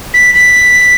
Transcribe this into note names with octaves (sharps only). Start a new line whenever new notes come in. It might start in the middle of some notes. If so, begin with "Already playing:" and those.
B6
B6